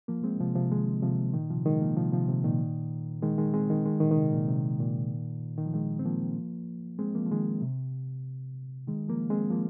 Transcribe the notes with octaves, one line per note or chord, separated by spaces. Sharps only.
F3 A#3
G#3 C4
C3 F3
C3 F3
D#3 G#3
C3 F3
A#2 D#3
C3 F3
D#3 G#3
F3 A#3
C3 F3
C3 F3
C3
A#2 D#3
D#3 G#3
D#3 G#3
G#3 C4
D#3 G#3
D#3 G#3
A#2 D#3
D#3
C3
A#2
C3
A#2 D#3
D#3
F3
D#3 G#3
C4
F3 A#3
G#3 C4
F3 A#3
F3
D#3 G#3
C3
D#3 G#3
F3 A#3
G#3 C4
F3 A#3